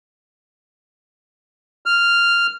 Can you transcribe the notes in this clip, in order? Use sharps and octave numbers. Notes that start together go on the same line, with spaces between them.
F6